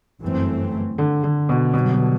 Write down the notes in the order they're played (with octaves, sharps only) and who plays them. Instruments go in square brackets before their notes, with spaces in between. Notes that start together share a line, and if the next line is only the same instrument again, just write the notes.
[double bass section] G1 F#2 E3 A3 C4
[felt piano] D3
D3
B2
[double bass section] G2 D3 F#3 [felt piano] B2
[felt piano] B2